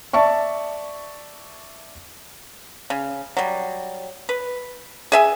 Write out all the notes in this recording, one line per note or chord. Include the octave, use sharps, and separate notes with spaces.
D5 E5 A5 C#6
C#3
F#3 G3
B4
G#4 E5 G#5